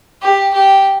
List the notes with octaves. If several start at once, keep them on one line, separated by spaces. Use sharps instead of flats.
G4
G4